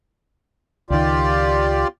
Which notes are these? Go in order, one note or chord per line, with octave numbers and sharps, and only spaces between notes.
C#2 D#3 F4 G4 D5